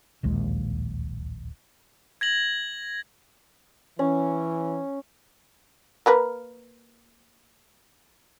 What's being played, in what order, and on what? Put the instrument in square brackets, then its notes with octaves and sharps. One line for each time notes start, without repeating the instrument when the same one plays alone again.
[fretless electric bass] D1 A#1 D#2 G#3
[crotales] G#6 A#6 F#7
[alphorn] E3 [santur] C#4
[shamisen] A#3 A#4 B4